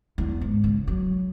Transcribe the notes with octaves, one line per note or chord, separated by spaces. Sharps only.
E2
G#2
C#3
F#3